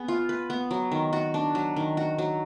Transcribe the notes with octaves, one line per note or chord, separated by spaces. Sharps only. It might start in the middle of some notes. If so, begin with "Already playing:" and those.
Already playing: B3 G#4
F4
B4
B3
F#3
D#3
F#4
D4
F#3
D#3
F#4
F#3